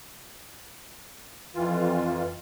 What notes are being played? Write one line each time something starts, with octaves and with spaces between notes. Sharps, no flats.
F2 E3 F4